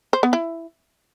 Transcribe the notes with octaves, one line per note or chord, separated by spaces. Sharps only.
C5
B3
E4